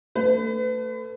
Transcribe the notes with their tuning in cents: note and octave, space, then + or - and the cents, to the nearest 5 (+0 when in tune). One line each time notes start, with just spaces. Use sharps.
A3 +25 B4 +35